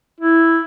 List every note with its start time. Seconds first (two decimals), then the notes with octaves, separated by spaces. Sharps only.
0.20 E4